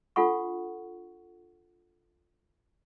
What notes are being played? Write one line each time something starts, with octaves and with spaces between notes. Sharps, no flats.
D4 F4 A4 F#5 C#6